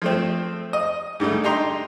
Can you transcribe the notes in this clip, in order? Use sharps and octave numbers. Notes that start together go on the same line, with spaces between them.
F3 A3 C4
D#5
G#2 D3 G3 A3
D4 D#4 G4 A#5 C6